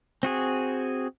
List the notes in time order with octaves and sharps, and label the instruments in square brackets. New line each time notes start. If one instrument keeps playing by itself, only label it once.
[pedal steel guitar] C4 F#4 G#4